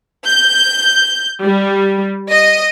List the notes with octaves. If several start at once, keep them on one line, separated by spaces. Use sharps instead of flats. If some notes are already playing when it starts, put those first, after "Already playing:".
G6
G3
D#5